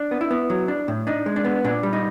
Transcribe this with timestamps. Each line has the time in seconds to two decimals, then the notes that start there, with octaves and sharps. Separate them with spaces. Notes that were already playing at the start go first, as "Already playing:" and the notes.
Already playing: D4
0.11 B3
0.21 E4
0.31 B3
0.50 F#3
0.68 D4
0.88 A2
1.07 D4 D#4
1.26 G#3
1.36 D4
1.44 B3
1.64 A#2 D4
1.83 G3
1.93 D#4